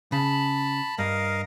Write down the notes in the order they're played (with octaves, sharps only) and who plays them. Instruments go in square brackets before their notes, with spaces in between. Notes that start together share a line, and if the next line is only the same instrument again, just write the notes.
[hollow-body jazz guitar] C#3 [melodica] A5 B5
[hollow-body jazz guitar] G2 [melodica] A#4 D#5 F5